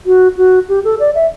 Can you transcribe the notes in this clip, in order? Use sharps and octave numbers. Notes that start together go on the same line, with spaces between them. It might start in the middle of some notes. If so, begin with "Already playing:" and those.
F#4
F#4
G4
A4
D5
E5